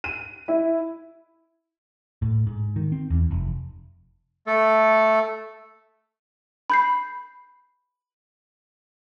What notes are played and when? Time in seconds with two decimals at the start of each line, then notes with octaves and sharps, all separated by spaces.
0.04 D#7
0.48 E4
2.22 A2
2.47 G#2
2.76 D#3
2.92 C4
3.10 E2
3.31 F1
4.47 A3 A4
6.70 B5 G6 C7